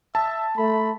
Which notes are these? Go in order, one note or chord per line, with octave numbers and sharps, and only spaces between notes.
E5 A5
A3 B5